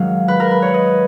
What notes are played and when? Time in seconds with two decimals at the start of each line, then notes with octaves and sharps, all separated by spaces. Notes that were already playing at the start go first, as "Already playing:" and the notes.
Already playing: G#2 D#3 F#3 F5
0.28 B4
0.40 A#4
0.51 B4
0.62 C#5
0.74 D#5